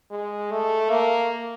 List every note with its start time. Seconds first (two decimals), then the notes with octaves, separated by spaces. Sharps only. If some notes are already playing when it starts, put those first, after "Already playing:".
0.11 G#3
0.51 A3
0.90 A#3